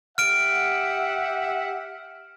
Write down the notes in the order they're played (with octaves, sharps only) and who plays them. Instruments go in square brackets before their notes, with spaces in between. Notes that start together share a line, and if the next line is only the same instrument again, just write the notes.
[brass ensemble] G4 E5 F#5 [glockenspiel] F6 D7